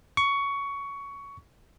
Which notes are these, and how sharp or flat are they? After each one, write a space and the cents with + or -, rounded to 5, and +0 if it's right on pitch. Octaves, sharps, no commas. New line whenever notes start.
C#6 +15